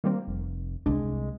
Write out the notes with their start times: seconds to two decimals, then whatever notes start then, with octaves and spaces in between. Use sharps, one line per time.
0.04 D#3 G3 A#3 C4
0.27 F1
0.86 C2 G3 G#3 D4